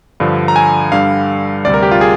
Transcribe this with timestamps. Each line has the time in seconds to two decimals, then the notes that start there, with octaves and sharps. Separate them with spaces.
0.20 G2 D3 F3
0.48 A#5
0.56 G#5
0.92 G2 D3 G3 F5
1.65 D2 C3 G3 D5
1.74 A#4
1.82 G4
1.91 F4
2.01 G#4